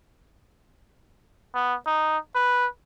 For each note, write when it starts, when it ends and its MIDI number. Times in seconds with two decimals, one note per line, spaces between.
1.55 1.74 59
1.87 2.18 63
2.35 2.67 71